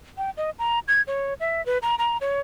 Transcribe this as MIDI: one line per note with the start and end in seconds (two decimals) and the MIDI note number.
0.18 0.30 79
0.37 0.50 75
0.59 0.79 82
0.88 1.02 92
1.07 1.34 73
1.40 1.64 76
1.66 1.78 71
1.82 1.95 82
1.98 2.17 82
2.21 2.41 73